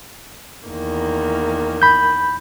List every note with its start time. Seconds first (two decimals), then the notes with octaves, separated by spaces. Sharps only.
0.67 E2 D#3 A#3
1.82 B5 G6